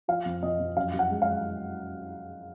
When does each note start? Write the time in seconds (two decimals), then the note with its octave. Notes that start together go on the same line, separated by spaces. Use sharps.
0.08 F3 F5
0.25 F2
0.43 F2 D#5
0.60 F2
0.76 F#2 F5
0.93 F#2
0.99 F#5
1.11 G#3
1.22 F5